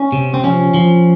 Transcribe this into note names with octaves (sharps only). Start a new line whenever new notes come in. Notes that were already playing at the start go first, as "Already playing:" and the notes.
Already playing: C#4
C3
C4
F3 C#4
F3